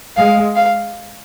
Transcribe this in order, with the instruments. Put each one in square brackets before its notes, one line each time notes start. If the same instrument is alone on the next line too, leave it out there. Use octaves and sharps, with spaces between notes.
[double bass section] G#3 [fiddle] F5
[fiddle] F5